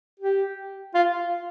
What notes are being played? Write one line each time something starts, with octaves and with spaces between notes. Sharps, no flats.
G4
F4